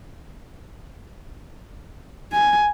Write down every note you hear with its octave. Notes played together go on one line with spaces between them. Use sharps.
G#5